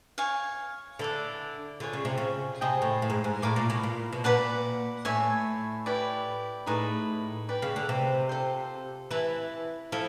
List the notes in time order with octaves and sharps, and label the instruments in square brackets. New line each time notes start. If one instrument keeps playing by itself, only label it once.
[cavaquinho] C#5 F5 G#5
[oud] D3 [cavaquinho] E4 A4 D5
[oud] D3 [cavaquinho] F4 G#4 C#5
[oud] C#3
C3
C#3
[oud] C3 [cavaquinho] G#4 C5 D#5 G5
[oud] A2
A2
G#2
G#2
[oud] A2 [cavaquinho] D5 F5 A#5 D6
[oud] A#2
B2
A#2
B2
[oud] A#2 [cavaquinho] B4 D5 F#5 A5
[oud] A2 [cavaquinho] C#5 E5 G#5
[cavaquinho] E4 G4 B4 D5
[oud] A2 [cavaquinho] D#4 G#4 B4
[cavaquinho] G4 B4 D5
[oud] C#3
D3
C3
[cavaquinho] F4 A4 C5
[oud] E3 [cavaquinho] B4 E5 A5
[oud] F3 [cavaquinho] E4 A4